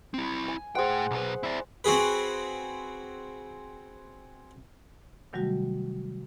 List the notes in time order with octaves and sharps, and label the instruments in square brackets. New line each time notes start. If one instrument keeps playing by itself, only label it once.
[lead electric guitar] C4 E4
[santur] G#5
[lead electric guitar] A2 G5 [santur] G#4 C5 F#5
[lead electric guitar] B1 B4
E4 D5
[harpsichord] C4 F#4 G#4 B4
[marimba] C3 D#3 F#3 G3 A3 F#4